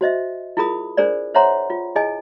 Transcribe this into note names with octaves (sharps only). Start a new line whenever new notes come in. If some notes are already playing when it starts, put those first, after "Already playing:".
F#4 C5 D#5 E5
E4 F4 G#4 A#4 B5 D#6
D4 G#4 A#4 C5 D5
C5 C#5 E5 F#5 A#5 C6
F4
E4 G#4 D#5 G#5